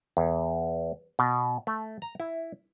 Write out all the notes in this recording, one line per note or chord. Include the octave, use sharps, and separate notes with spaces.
E2
B2
A3
A#5
E4